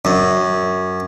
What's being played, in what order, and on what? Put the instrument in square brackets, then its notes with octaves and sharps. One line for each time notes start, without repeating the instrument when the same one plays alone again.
[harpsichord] F#2